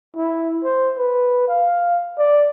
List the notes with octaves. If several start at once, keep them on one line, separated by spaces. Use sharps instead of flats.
E4
C5
B4
F5
D5